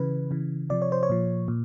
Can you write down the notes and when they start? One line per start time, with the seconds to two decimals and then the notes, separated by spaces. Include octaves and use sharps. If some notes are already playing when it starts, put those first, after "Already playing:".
Already playing: C#3 E3 B4
0.31 C#3 E3
0.70 C3 F3 D5
0.82 C#5
0.92 C5
1.03 C#5
1.09 A#2 F3
1.48 A#2